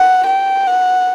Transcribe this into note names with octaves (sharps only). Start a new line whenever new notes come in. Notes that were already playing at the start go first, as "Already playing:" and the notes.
Already playing: F#5
G5
F#5